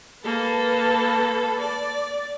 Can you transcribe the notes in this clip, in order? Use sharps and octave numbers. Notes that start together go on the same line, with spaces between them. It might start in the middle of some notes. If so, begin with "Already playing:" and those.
A#3 A4 B4 A5
D5